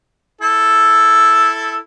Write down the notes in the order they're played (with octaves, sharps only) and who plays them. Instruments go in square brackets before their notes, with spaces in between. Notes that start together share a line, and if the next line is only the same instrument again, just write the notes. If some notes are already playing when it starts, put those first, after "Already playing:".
[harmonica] E4 A4